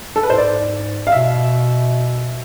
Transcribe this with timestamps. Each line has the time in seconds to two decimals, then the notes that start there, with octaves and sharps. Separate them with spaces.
0.16 A4
0.23 B4
0.30 A2 C5
0.38 G#2 D5
1.07 F5
1.12 B2 E5